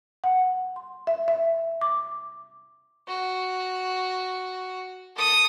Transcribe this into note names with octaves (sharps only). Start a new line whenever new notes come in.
F#5
C6
E5
E5
D6
F#4
A4 D#6